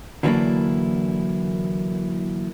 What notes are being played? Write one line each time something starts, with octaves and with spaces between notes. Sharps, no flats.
D3 E3 F#3 A#3 D4 E4